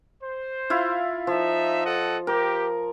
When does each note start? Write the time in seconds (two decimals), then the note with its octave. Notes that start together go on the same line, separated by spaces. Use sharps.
0.22 C5
0.70 E4 F4 F5
1.27 F3 D#4 E5
1.84 A4 D#5 F#5
2.27 G4 A#4